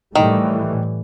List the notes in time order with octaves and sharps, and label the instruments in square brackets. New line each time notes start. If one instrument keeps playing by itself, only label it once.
[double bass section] A2 E3 G3 [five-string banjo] D#3